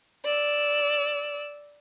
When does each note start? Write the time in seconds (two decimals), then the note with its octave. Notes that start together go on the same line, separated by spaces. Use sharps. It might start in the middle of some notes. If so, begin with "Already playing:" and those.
0.25 D5 E6